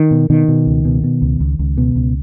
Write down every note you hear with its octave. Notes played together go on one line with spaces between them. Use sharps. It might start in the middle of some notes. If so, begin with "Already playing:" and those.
Already playing: D#3
B2
B2 D#3
B2
C#2
B2
B2
C#2
C#2
C#2
B2
C#2